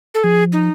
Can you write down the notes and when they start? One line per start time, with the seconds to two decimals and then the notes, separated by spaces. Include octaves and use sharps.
0.14 A4
0.24 F3 G#4
0.53 D#4